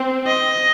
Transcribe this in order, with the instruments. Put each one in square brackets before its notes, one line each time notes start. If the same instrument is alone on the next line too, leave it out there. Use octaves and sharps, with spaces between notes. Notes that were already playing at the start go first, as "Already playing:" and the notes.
Already playing: [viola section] C4
[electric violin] D#5